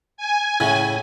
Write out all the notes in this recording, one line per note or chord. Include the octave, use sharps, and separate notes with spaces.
G#5
A2 C#3